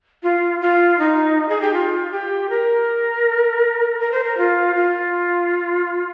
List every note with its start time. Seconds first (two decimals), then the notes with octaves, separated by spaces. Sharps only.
0.23 F4
0.61 F4
0.99 D#4
1.49 G#4
1.61 G4
1.74 F4
2.12 G4
2.50 A#4
4.00 A#4
4.12 C5
4.24 A#4
4.37 F4
4.75 F4